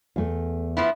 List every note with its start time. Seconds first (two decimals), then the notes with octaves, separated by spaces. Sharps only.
0.16 E2 A3
0.77 F3 B3 E4